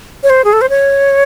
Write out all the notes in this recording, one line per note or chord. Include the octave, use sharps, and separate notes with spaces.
C#5
C5
G#4
A4
C5
C#5